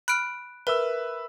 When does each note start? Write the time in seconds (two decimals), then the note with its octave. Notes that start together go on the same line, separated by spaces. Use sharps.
0.08 B5 F6 F#6 D7
0.67 A#4 B4 E5 E6